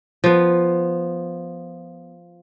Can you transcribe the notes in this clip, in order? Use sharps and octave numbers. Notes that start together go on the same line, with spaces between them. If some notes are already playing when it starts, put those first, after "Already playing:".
F3 B3